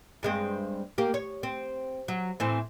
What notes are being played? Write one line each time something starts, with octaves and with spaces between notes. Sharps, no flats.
G2 G#3 C4
A#3 G4
C#5
C4
F#3
A2 E3 C4